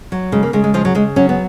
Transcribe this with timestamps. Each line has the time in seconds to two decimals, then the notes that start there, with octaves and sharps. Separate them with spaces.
0.12 F#3
0.32 C#3 G#3
0.43 A#3
0.53 C#3 G#3
0.64 G#3
0.74 F3 G#3
0.85 F#3
0.95 C#3 G#3
1.16 F#3 C#4
1.29 B3